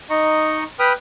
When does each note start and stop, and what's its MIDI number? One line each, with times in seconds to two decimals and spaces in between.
0.10 0.64 63
0.10 0.64 75
0.10 0.64 82
0.10 0.64 85
0.79 0.93 71
0.79 0.93 79
0.79 0.93 83
0.79 0.93 87
0.79 0.93 89